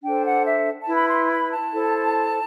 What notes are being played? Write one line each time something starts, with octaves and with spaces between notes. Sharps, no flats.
D4 A4 C5 G5
F#5
E5
A5
E4 B4
B5
C6
B5
A5
E4 A4 C5